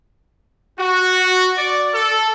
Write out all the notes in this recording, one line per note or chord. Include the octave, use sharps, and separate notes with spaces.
F#4
D5
A4